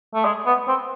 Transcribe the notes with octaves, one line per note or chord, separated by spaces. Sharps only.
A3
G#3
B3
C4